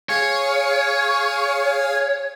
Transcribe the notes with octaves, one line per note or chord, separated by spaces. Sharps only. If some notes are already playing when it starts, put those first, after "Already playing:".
G#4 C#5 F5 G#5